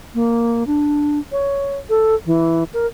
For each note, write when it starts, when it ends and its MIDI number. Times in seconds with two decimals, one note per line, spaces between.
0.14 0.66 58
0.67 1.19 62
1.32 1.78 73
1.90 2.15 69
2.26 2.64 52
2.74 2.86 70